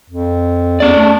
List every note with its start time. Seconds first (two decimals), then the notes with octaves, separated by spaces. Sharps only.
0.10 F2
0.80 E2 C#4 D5
0.96 A3